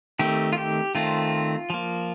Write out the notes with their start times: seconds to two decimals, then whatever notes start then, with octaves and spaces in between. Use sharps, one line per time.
0.19 D#3 A3 C4 G4
0.53 F4
0.58 G4
0.95 D#3 A3 C4 F4
1.70 F3 A#3